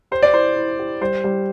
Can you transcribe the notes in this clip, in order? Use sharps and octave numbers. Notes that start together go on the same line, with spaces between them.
G4 C5
D5
E4 C5
E4
G4
G3 C5
G3